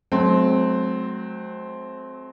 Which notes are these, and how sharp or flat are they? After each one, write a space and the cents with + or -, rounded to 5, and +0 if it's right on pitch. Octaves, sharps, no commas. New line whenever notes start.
F#3 +0 A3 -40 C4 +0